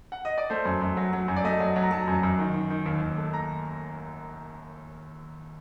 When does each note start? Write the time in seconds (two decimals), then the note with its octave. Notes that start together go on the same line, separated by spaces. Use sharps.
0.12 F#5
0.25 D#5
0.38 D5
0.50 A3 C5
0.65 F#2
0.82 F#2
0.97 F#3
1.13 F#3
1.28 F#2
1.36 D5
1.44 A3 D#5
1.60 F#3
1.76 F#3
1.83 A#5
1.91 F#3 A5
2.08 F#2
2.23 F#2
2.39 D#3
2.54 D#3
2.70 D#3
2.86 D#2
3.02 D#2
3.17 A3
3.33 A#5